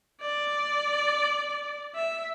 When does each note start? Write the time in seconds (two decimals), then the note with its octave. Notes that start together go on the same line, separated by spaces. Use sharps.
0.21 D5
1.95 E5